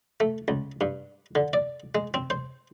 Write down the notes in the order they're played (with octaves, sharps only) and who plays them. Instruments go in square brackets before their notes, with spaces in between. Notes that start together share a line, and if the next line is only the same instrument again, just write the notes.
[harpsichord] A3
C#2
G2
D3
D5
G#3
C4
C5